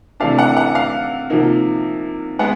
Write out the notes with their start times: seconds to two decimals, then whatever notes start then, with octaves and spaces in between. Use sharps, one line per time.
0.20 C3 E3 A3 D4 F5
0.39 F#5
0.57 F#5
0.75 F5
1.30 C3 F3 A#3 D#4
2.39 G#3 B3 F#5